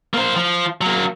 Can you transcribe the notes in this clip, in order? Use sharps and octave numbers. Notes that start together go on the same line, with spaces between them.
A#3 C5
F3
F#3 A#3